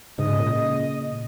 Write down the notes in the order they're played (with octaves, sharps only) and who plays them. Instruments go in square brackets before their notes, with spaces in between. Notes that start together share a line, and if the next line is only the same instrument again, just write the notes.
[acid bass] G#2 [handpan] C#3 [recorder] D#5
[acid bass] A#2